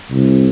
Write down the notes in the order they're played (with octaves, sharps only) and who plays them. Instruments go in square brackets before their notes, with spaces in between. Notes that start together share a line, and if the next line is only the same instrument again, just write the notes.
[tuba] C2